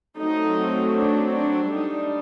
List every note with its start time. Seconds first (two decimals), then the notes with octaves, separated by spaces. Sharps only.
0.18 F#3 A3 C4 D#4
0.95 D4
1.33 D4
1.72 G3 D4 D#4